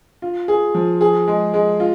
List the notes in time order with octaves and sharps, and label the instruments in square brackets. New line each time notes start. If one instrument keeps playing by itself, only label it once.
[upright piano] F4
G#4
F3
G#4
G#3
G#3
F4